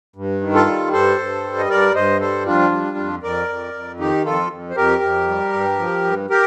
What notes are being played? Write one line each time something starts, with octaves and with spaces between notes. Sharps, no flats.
G2
D#3
F4 A4
G3
G2 A4 C5
G2
G3
D#5
G2 A#4 D5
G2 C5 D#5
G3 A4 C5
F2 D4 F4
G3
F2
F2 A#4 D5
F2
F2
D#3 D#4 G4
F2 F4 A4
F2
C5
F2 G4 A#4
F2
G3
G2
F3
G2
G4 A#4